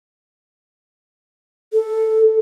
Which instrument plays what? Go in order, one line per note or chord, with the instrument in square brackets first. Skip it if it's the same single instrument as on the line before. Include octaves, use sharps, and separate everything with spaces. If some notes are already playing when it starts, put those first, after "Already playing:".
[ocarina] A4